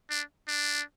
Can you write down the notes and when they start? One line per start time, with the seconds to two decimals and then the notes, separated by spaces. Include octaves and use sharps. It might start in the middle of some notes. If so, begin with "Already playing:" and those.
0.10 D4
0.48 D4